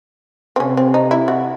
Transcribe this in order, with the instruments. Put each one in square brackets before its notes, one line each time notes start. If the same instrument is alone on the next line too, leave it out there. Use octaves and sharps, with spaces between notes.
[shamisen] C4
[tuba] C3 [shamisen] C#4
[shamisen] C4
D#4
E4
F#4